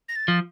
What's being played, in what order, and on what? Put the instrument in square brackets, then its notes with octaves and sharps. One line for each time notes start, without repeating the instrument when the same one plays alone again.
[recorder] A#6
A6
[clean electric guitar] F3